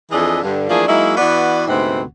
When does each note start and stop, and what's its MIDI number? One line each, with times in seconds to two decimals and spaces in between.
0.11 0.39 41
0.11 0.39 52
0.11 0.39 62
0.11 0.39 68
0.11 0.39 75
0.11 0.39 76
0.43 0.67 43
0.43 0.67 50
0.69 0.86 52
0.69 0.86 53
0.69 0.86 57
0.69 0.86 58
0.69 0.86 62
0.69 0.86 68
0.88 1.15 54
0.88 1.15 56
0.88 1.15 58
0.88 1.15 63
0.88 1.15 64
1.17 1.63 52
1.17 1.63 59
1.17 1.63 66
1.17 1.63 74
1.68 2.02 38
1.68 2.02 44
1.68 2.02 48
1.68 2.02 59
1.68 2.02 60
1.68 2.02 78